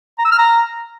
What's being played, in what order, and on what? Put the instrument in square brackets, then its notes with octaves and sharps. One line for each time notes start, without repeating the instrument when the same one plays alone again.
[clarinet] A#5
E6
F6
A#5